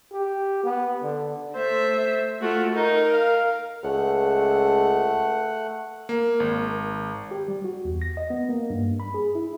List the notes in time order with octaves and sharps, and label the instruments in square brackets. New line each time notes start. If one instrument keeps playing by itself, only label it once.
[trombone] G4
B3
D3
[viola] A3 E5 [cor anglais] C5
[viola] A3 F4 [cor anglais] F#4
[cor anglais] D#4 [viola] A#4
[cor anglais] F5
[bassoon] C#2 [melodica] A3 F#5
[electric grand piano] A#3
G#1
[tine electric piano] G4
G3
F#4
E2
A#6
D#5
B3
A#3
G2
B5
G#4
E4